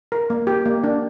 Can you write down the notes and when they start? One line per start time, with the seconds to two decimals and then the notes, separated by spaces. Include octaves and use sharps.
0.12 A#4
0.30 A#3
0.47 G4
0.66 A#3
0.84 D4